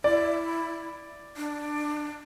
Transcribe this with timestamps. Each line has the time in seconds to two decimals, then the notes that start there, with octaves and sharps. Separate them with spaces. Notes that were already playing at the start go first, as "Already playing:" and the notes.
0.04 E4 D5
1.37 D4